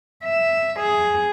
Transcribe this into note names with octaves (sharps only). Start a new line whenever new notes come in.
E5
G#4